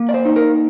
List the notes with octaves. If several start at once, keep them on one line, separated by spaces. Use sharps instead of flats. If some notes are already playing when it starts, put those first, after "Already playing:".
Already playing: A#3
D5
C5
D#4
A#4